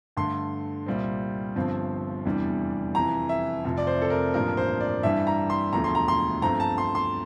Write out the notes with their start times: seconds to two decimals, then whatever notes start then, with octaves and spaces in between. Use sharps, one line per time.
0.17 G2 D3 A3 C6
0.86 C2 A#2 G3 C4
1.56 G1 G2 F3 C4
2.25 F1 E2 E3 G3 D4
2.94 F1 F2 E3 A#5
3.29 E5
3.65 F1 F2 C3 F3
3.78 D5
3.87 C5
4.02 A4
4.10 A#4
4.34 A1 G2 F3 A#3 D4 A#4
4.57 C5
4.81 D5
5.03 G2 E3 G3 D4 E5
5.27 A#5
5.50 C6
5.73 E1 D2 D3 F3 A3 A#5
5.84 C6
5.95 A#5
6.08 C6
6.42 G2 F3 A3 C4 A#5
6.60 A5
6.78 C6
6.95 C6